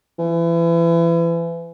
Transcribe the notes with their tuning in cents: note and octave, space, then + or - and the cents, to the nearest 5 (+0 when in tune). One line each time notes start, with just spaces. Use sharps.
E3 +30